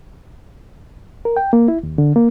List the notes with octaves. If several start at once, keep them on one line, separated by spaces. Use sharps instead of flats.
A#4
G5
A#3
E4
D#2
D3
A#3